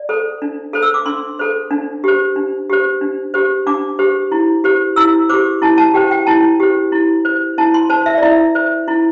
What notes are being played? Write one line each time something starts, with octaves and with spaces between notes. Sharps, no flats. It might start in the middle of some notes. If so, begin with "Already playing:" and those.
Already playing: D5
A4 C5
D4
A4 C5
E6
D6
D4 C6
A4 C5
D4
G4 C5
D4
G4 C5
D4
G4 C5
D4 D6
G4 C5
E4
G4 C5
E4 E6
G4 C5 D6
E4 A5
A5
G4 C5 G5
G5
E4 A5
G4 C5
E4
C5
E4 A5
C6
C5 A5
E5
D5
E4 E5
C5
E4